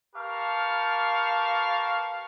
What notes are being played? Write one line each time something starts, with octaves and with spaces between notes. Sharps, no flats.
G4 A#4 B4 F5 A5 C#6